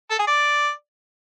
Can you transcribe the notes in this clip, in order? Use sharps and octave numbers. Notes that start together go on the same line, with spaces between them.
A4
G#4
D5